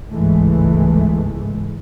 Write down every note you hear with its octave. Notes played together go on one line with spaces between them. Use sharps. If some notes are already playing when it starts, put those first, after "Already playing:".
G1 C#2 G#2 E3 G#3 A3